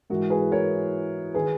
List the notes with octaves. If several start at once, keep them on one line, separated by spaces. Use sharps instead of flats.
G#2 E3 F#4 A#4
G#4 B4
A#4 C#5
D#3 G#4 B4